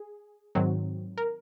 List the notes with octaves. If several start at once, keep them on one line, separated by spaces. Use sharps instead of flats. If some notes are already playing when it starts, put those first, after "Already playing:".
Already playing: G#4
G#2 D#3 F#3 C4
A#4